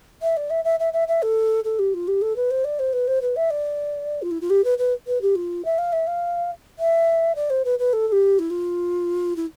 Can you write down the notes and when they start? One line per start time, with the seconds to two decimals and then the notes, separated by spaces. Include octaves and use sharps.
0.22 E5
0.37 D5
0.50 E5
0.64 E5
0.80 E5
0.93 E5
1.08 E5
1.22 A4
1.64 A4
1.79 G4
1.94 F4
2.08 G4
2.22 A4
2.36 B4
2.51 C5
2.64 D5
2.79 C5
2.93 B4
3.07 C5
3.22 B4
3.36 E5
3.50 D5
4.22 F4
4.31 E4
4.41 F4
4.50 G4
4.64 B4
4.78 B4
5.07 B4
5.22 G4
5.35 F4
5.65 E5
5.78 F5
5.92 E5
6.07 F5
6.79 E5
7.35 D5
7.50 C5
7.65 B4
7.79 B4
7.93 A4
8.07 A4
8.12 G4
8.39 E4
8.50 F4
9.36 E4